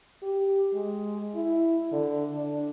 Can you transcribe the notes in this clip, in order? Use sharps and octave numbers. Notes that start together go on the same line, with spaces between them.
G4
G#3
E4
D3
D4